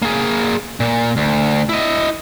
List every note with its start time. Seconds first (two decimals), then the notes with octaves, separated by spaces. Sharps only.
0.02 A#3 G#4
0.80 A#2
1.17 D2
1.69 E4 D#5